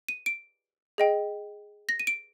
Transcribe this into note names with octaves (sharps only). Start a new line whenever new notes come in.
D#7
D7
G#4 D#5 G5
A#6
D#7
D7